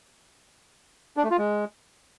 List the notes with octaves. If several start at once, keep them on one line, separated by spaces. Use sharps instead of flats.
D4
A3
F4
G#3